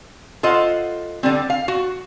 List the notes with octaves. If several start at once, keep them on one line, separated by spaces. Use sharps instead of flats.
F4 A4 C5 D#5 F#5
D3 G3 C4
F5
F#4